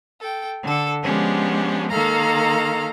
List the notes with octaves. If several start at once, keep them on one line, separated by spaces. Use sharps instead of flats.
A4 G5
D3 A4
F3 G#3 B3 C#4 D4 G4
D#3 A#3 A4 F5 A#5